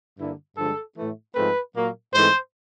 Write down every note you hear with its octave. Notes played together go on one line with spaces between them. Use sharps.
G2 D3 G3 A#3 E4
G2 D3 F3 G#3 A4
A2 E3 A3
G#2 F3 A3 C4 B4
A#2 F#3 A#3
G#2 E3 A3 C4 C5